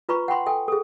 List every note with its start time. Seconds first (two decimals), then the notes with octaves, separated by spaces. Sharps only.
0.09 F4 B4 A#5 B5 C#6
0.28 F#5 G5 B5 C6
0.46 A4 G5 G#5
0.68 G#4 A4